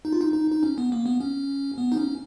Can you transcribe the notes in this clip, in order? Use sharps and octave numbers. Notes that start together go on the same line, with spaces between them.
D#4
F4
D#4
D#4
D#4
C#4
B3
A#3
B3
C#4
B3
D#4
C#4